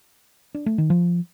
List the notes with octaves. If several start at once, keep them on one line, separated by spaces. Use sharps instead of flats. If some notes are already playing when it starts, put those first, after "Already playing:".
D4
A3
D#3
F3